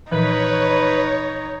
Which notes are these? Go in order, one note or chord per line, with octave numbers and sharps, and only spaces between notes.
A#2 E3 F3 D#4 B4 C#5